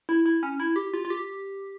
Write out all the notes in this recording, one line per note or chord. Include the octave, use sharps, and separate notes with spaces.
E4
E4
C#4
E4
G4
F4
F4
G4